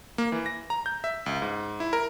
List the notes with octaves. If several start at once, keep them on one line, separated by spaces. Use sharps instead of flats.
A#3
E3
A#6
A#5
G6
E5
C#2
G#2
E4
A#4